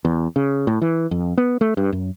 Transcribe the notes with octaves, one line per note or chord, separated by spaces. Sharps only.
E2
C#3
A2
E3
F2
B3
A3
G2
F#2